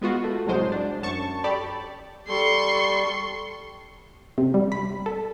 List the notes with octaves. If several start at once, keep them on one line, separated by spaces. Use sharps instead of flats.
G#3 B3 F4 F#4
A3
C2 A2 F#3 G#3 C5
D4
F#2 A5 C#6
G4 A4 D5 B5
G3 A4 C6 C#6
C3
G3
B5
A4